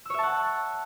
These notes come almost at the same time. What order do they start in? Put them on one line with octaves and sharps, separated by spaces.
E6 C#5 E5 A5 F#5